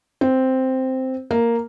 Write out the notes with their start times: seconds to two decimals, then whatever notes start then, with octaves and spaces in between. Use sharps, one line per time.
0.21 C4
1.31 A#3